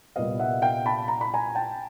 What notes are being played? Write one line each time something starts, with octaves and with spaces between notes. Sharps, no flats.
C2 A#2 G3 B3 D#5 F5
E5 F#5
F5 G5
A5 B5
A#5
B5
G#5 A#5
G5 A5